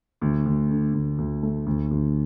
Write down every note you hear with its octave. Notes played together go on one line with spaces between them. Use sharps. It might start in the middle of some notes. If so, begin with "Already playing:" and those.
D2
D2
D3
D2
D2
A3
D2
D2